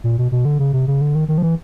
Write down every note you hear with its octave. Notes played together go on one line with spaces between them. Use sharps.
A#2
B2
B2
D3
C#3
C3
C#3
D3
D#3
D#3
F3
E3